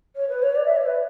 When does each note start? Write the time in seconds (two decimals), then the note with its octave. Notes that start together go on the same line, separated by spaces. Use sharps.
0.16 C#5
0.29 B4
0.43 C#5
0.56 D5
0.66 E5
0.77 C#5
0.86 B4